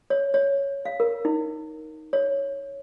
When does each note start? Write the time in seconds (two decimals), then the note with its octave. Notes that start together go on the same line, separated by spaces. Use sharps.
0.10 C#5
0.34 C#5
0.85 F5
1.00 A#4
1.25 D#4
2.13 C#5